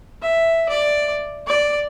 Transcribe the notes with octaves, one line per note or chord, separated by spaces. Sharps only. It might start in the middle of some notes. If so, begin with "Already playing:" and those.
E5
D5
D5